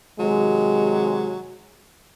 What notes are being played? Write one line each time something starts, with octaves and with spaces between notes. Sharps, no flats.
C3 D#3 F#3 G#3